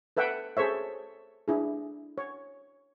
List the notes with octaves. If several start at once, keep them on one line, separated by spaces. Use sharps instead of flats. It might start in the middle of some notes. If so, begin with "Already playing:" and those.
A4 B4 E5 F#5 G5
G#4 A4 C5 C#5 E5
D4 E4 G#4
C#5